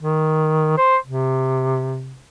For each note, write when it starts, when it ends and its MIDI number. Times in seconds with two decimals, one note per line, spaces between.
0.01 0.77 51
0.78 0.96 72
1.06 2.21 48